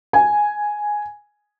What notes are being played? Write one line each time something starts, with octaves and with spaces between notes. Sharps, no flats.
G#5